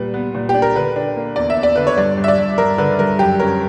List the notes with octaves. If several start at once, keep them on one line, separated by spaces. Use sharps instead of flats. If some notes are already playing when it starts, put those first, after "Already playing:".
Already playing: A#2 G3 B4
B3
A#2
G4
D4
A#4
D3 B4
D4
A#3
E2 D5
E5
E2
D5
D3 B4
C#5
G2 D5
G2
E5
D5
G2
G2 A#4
D3 B4
G2 A#4
F#2 G4
C#4 A#4